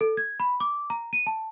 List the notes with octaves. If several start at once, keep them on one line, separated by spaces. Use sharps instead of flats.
A4
G#6
B5
D6
A#5
D#7
A5